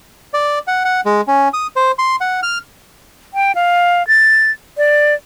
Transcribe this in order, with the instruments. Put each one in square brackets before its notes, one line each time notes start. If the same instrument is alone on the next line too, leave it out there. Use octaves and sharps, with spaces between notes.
[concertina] D5
F#5
F#5
G#3
C#4
D#6
C5
C6
F#5
F6
[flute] G5
F5
A6
D5